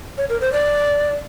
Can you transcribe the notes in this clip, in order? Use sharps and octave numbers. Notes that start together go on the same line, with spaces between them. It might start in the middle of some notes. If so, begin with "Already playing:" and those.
C#5
A#4
C5
D5